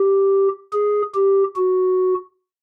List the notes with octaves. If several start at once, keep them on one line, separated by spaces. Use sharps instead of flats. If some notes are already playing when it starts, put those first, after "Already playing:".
Already playing: G4
G#4
G4
F#4